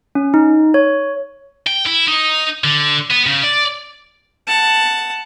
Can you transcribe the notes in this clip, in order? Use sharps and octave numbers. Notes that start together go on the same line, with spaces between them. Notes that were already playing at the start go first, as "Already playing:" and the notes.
C#4
D#4
C#5
G5
E4
D#4
D3
B3
C#3
D5
F#5 A5